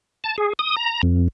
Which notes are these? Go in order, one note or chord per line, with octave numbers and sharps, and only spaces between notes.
A5
G#4
D#6
A#5
F2